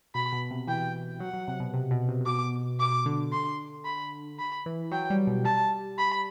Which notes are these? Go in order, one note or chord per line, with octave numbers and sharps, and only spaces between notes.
B2 B5
B2
C3
E3 G5
F#3 F#5
F#3
C3
B2
C3
B2
C3
C3
B2 D6
D6
D3
C6
B5
B5
E3
F#3 G5
G3
B2
G3 A5
B5